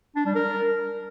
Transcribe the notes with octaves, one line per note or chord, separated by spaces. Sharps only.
D4
G3
A#4